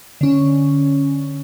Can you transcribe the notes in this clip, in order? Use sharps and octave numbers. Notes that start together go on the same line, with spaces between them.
D3 C#4